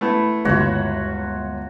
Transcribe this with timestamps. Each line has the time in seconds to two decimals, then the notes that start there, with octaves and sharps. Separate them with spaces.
0.01 A3 B3 E4
0.45 G1 D2 C#3 G#3 F4 F#4 C#5